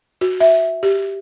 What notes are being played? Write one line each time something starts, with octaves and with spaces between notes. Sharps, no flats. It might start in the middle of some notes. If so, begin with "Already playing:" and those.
F#4
E5
G4